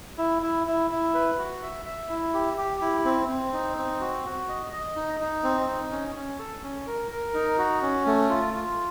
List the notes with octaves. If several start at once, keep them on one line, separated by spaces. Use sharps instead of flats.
E4
E4
E4
E4
B4
F#4
E5
E5
E4
G4
G4
E4
C4
C4
D#4
C4
F#4
F#4
D#5
D#5
D#4
D#4
C4
D#4
C#4
C#4
A4
C#4
A#4
A#4
D#4
F#4
C#4
A3
F4
F4